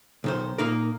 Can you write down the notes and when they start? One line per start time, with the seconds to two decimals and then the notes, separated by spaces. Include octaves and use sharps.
0.24 B1 D#3 C5
0.58 A#2 A#3 D#4 A#4